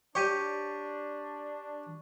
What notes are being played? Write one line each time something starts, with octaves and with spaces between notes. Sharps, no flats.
D4 G4 C#5 C#6 D#7